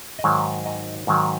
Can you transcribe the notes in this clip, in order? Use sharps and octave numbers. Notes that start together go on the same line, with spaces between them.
D#5
G#2 D#3 F#3 C#5
D#5
G#2 D#3 F#3